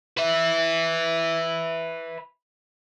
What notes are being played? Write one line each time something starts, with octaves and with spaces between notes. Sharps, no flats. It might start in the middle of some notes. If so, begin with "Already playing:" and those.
B4 E5